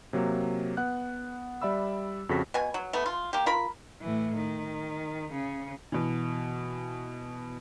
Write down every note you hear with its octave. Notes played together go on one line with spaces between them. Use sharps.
C3 F#3 A#3
B3 F#5 F#6
G3 D5 E5 B5 E6
F2 C#3 F#4 A4 A#6 B6
B2 G#5
F#3
A3 B3
F4
A#3 G4
F4 A#4 B5
A2 E3
D#3
C#3
B2 E3